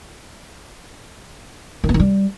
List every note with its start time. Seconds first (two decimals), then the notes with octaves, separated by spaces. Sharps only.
1.84 D#3
1.89 B3
1.94 D#3
2.00 G3